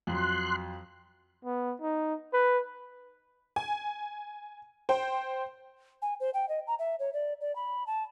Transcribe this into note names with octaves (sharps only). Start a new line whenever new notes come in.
F2 F#3 C6 F#6
B3
D#4
B4
G#5
C5 G5
G#5
C5
G5
D#5
A#5
E5
C#5
D5
D5
B5
A5